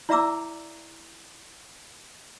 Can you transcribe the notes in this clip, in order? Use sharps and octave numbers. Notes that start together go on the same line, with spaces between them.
E4 D5 E5 A#5 D6 E6